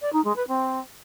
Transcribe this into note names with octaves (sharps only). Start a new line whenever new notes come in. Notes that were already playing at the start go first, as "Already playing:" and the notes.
D5
D#4
G#3
B4
C4